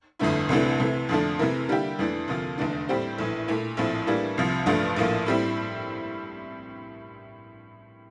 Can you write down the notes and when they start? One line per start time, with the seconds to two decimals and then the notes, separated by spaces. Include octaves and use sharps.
0.19 G1 F2 D3 A3 E4
0.49 C2 C3 E3 A3 D4
0.80 C3 E3 A3
1.09 F2 D3 F3 A3 D4
1.39 C3 E3 A3 E4 A#4
1.69 D3 G3 A#3 E4 G4
1.99 F2 E3 A3 D4
2.28 D2 C3 F3 A#3 F4
2.58 F1 E2 D3 A3 D4
2.88 A2 G3 C4 G4 C5
3.18 A#1 A2 E3
3.48 A#2 A3 E4
3.77 A#1 A2 F3 C4 E4
4.07 A2 E3 G3 A#3 D4
4.38 C2 C3 F3
4.66 A1 G2 F3 A3 D4
4.96 A#1 A2 F3 A#3
5.26 A2 G3 C4 E4